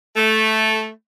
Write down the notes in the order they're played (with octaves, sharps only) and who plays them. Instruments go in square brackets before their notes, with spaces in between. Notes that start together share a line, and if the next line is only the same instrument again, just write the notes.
[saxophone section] A3